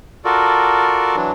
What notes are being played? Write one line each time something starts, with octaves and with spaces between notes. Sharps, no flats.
F4 F#4 A4 A#4 D5
E3 F#3 D4